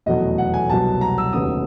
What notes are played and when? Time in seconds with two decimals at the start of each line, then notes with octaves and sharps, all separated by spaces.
0.06 F1 E2 B2 F#3 A3 D#5
0.38 F#5
0.54 G#5
0.70 C2 B2 F#3 A5
1.01 A#5
1.18 E6
1.33 F1 D#2 C#3 F#3 B3 D#6